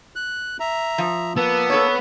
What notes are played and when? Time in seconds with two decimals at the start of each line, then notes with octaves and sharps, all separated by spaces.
0.16 F#6
0.60 E5 A#5
0.98 F3
1.36 A#3 B3 A5 E6
1.70 A4 B4 C#5